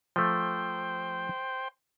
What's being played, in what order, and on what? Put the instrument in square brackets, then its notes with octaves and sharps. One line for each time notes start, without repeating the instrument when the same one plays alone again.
[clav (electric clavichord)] F3 A3 [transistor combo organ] C5 G5